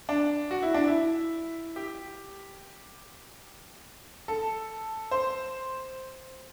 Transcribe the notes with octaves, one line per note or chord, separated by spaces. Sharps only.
D4
F#4
E4
D4
E4
G4
A4
C5